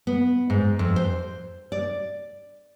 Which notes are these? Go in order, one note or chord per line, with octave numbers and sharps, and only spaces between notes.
B3
G#2
F2
C5
D5